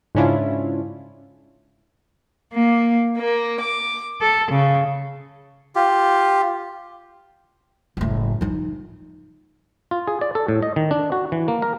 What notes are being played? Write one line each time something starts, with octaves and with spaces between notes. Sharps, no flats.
G#2 C#3 C#4 D4 E4 F4
A#3
A#3
D6
A4
C#3
F4 G4
F#1 A2
F3 D#4
F4
G#4
D5
A4
A2
D#5
D#3
D4
F#4
E3
A#3
A#4